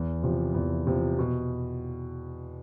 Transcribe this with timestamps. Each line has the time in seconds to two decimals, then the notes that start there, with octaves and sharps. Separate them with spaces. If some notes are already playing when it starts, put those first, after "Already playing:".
Already playing: E2
0.23 C3 F3
0.54 E2
0.87 C3 F3
1.19 B2